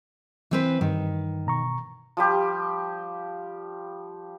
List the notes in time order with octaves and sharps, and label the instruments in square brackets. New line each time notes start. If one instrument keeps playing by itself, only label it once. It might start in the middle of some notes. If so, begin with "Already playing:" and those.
[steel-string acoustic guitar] E3 C4 B4
[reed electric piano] G2 [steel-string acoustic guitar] D#3
[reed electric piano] B2 A#5 C#6
[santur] F3 G3 G4